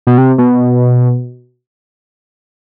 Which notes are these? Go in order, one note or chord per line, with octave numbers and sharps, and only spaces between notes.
B2
C3
B2